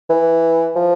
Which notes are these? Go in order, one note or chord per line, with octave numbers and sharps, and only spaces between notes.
E3
F3